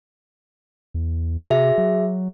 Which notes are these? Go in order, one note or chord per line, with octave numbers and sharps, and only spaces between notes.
E2
C3 F#4 G#4 E5
F#3